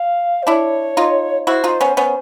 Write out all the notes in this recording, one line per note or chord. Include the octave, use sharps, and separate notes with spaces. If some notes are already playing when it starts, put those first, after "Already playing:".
Already playing: F5
C5
D4 E4 C#5
D#4 F4
E4 F#4 C5
D#4 F4
B3 C#4
B3 C#4 C5